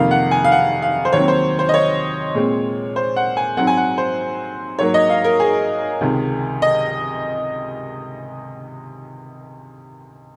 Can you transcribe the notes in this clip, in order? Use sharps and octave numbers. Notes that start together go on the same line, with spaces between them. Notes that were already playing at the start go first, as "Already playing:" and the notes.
Already playing: F2 C3 D#3 A#3 F5
F#5
G#5
F5
F#5
F5
C5
D#2 D#3 F#3 C4 C#5
C5
C5
D#5
C#5
A#2 G#3 C4
C5
F#5
G#5
G#2 F#3 C4 F#5
G#5
F#5
C5
G#2 F#3 A#3 C#5
D#5
F5
A#4
G#4
C#2 C3 D#3
D#5